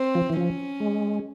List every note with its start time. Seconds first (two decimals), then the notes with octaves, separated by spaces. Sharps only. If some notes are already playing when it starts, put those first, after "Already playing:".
Already playing: C4
0.15 F3
0.30 E3
0.37 F3 C#4
0.80 G#3